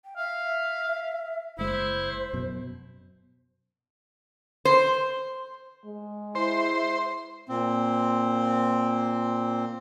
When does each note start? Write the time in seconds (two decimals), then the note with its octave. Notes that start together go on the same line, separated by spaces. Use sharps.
0.04 G5
0.17 E5 F5
1.59 F#1 G#3 E4 C5
2.33 F#2 B2
4.65 C5
5.86 G#3
6.35 E4 C5
7.48 A#2 C4